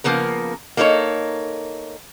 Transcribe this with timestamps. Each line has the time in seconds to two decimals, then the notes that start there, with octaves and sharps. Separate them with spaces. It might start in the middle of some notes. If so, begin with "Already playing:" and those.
0.04 C#3 F3 A#3 B3 A#4
0.77 A#3 D#4 A4 A#4 C#5